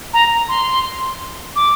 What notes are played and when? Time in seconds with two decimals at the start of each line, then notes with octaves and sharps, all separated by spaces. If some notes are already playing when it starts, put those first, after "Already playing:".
0.14 A#5
0.49 C6
1.56 D6